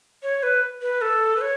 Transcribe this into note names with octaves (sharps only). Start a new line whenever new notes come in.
C#5
B4
B4
A4
B4
C#5